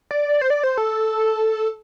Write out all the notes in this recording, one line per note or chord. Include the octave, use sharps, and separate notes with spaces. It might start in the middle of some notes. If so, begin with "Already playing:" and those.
D5
C5
D5
C5
A4